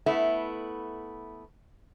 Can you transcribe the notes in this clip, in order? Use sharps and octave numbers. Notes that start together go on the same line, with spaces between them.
A3 B3 E4